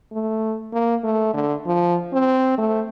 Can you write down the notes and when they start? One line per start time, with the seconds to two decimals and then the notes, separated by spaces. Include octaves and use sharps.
0.12 A3
0.73 A#3
1.04 A3
1.34 D3
1.66 F3
2.13 C4
2.58 A3